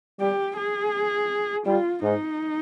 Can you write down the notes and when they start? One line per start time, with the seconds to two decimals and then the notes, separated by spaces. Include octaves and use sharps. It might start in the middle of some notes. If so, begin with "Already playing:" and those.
0.20 G3 G4
0.57 G#4
1.66 G3 F4
2.03 G#2 D#4